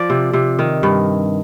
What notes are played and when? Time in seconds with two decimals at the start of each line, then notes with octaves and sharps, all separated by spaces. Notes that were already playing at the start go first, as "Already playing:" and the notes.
Already playing: F3 D5
0.10 C3
0.33 C3
0.59 D#3
0.83 G2